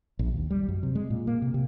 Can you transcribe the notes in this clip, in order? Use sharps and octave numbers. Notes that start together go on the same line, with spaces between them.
A#1
D#2
G3
F#2
C3
G#3
A#2
A#3
C3
C3